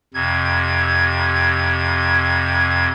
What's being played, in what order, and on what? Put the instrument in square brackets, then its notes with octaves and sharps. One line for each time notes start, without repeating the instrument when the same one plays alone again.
[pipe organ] F2 C3 G#6